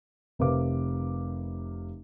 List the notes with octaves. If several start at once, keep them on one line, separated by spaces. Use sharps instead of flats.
F1 C3 A#4 B4 F5 D6